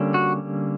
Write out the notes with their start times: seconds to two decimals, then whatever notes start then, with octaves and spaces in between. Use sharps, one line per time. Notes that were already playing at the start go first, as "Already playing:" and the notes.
Already playing: D3 G3 A#3 C#4
0.14 F#4